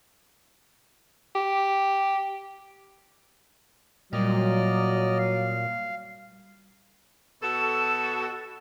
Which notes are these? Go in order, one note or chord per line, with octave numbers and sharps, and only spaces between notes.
G4
A#2 F#3 G3 D5 D#5 F6
F5
B2 F#4 A4 E7